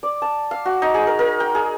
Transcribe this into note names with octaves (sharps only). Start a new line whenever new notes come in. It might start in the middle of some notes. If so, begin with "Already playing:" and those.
D5
A5
F5
F#4
D#4
G#4
A#4
A#4
G5
G#4